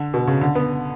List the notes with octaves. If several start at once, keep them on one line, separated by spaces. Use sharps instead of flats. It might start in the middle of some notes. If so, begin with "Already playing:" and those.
Already playing: D3
B2
C#3
D3
B3